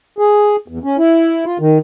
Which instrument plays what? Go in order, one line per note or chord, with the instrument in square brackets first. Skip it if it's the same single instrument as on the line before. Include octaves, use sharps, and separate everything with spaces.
[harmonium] G#4
E2
C#4
E4
F4
D#3